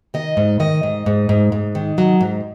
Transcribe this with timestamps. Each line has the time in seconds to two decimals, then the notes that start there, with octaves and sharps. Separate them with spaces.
0.14 D#3 D#5
0.37 G#2
0.60 D#3 D#5
0.83 G#2
1.06 G#2
1.29 G#2
1.52 G#2
1.75 D#3
1.98 F#3
2.21 G#2